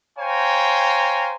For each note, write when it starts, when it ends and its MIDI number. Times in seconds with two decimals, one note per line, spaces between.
0.19 1.36 72
0.19 1.36 73
0.19 1.36 77
0.19 1.36 79
0.19 1.36 80
0.19 1.36 82